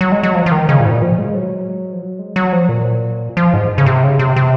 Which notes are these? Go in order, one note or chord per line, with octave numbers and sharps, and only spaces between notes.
F#3
G#3
F#3
F3
F3
D#3
C#3
A#2
G#2
A#2
F3
G#3
F#3
F3
F#3
G#3
F#3
F3
A#2
F3
G#2
C#3
C3
C#3
C3
C3